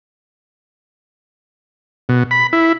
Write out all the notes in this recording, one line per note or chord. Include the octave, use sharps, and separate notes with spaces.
B2
B5
E4